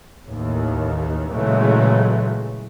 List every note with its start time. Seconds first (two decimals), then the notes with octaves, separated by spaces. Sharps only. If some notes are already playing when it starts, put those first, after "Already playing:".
0.27 A1 D#2 D#3
1.30 A#2 C#3 E3 F#3 G#3 A3